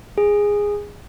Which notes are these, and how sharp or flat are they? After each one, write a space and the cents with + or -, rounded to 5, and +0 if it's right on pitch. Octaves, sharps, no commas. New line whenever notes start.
G#4 -10